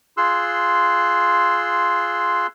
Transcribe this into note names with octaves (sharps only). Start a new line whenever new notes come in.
F4 G#4 C6 E6 F#6